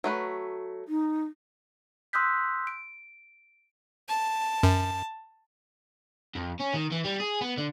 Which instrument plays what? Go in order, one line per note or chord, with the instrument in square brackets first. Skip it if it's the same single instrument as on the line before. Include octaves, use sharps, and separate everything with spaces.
[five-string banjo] F#3 A3 B4
[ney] D#4
[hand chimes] C6 D#6 E6 F#6 G6 B6
D7
[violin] A5
[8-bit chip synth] F#2
[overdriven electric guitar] F2
C#4
D#3
E3
G3
G#4
B3
D3